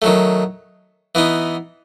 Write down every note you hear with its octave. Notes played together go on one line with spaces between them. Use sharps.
D#3 F#3 A3
E3 B3 D#4